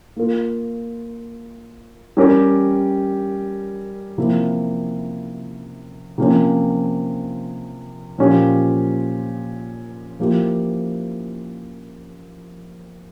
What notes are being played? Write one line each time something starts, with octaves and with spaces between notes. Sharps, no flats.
A#3 F4 A#4
G3 C#4 G4 A#4
C3 F3 A#3 E4
C3 F3 A#3 C#4
A#2 F3 A#3 C#4 G4
F3 A#3 E4 G4